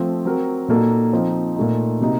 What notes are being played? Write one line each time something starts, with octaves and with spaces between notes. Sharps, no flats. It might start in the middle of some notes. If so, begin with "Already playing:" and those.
Already playing: F3 A3 C4
F#3 C4 F#4 A#4
A#2 F#3 A#3 D#4 A4
F3 C4 D#4
A#2 A3 D#4
C3 F#3 A#3 D#4